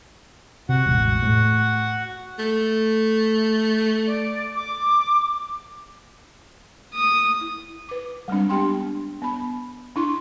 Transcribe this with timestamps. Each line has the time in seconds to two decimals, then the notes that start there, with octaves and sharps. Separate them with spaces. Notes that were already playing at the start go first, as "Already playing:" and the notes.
0.69 C3 F#4 F#5
0.86 E1 A1
1.22 A2
2.39 A3
4.07 D5
4.55 D6
6.94 D#6
7.41 E4
7.89 B4 D6
8.28 G3 G#3 C4 D4
8.49 B3 D4 G4 G5 C6
9.22 B3 B5
9.96 D4 E4 C6